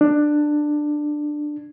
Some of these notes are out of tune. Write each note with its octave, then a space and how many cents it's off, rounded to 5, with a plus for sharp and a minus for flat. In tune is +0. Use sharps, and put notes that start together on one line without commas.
D4 +15